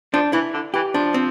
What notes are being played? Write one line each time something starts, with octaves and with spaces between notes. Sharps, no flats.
F3 D4
E3 E4
D3
E3 G4
F3 D4
C4